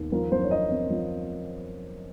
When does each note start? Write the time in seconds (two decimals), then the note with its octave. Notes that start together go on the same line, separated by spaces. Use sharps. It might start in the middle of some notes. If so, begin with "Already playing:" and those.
Already playing: D#2
0.12 F3 A#4
0.32 F#2 C5
0.43 C#5
0.51 D#4 D#5
0.71 C4
0.90 F3